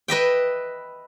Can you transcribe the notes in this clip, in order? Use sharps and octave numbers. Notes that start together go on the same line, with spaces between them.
B4 D#5 E5 G5